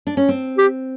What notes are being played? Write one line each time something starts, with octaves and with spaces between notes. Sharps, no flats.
D4
C#4
C4
G4